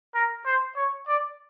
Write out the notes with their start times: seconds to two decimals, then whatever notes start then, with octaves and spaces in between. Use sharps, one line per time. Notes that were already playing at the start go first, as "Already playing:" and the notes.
0.15 A#4
0.46 C5
0.76 C#5
1.08 D5